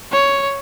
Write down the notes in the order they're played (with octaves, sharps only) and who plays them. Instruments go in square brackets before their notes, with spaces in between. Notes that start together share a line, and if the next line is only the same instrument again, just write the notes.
[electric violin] C#5